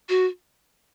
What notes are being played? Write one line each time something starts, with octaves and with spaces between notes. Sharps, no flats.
F#4